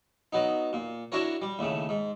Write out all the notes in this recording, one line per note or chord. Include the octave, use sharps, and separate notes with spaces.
F#3 B3 D#4
A#2
D4 E4 F#4 A#4 C#5
G3
D#2 A2 C#3
G#2